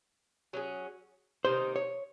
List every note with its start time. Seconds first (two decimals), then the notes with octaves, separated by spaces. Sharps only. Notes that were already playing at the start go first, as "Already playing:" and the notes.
0.53 F#3 C#4 G#4
1.45 C3 D#3 A#3 D#4 C5
1.76 C#5